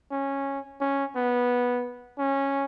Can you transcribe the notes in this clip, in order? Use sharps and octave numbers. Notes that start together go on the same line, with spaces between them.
C#4
C#4
B3
C#4